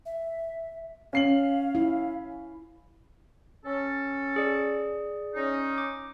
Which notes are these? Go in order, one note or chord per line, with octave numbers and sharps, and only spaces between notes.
E5
C#4 F5 C7 F#7
E4
C#4 A4
G#4 D5
C#4 D#4
D6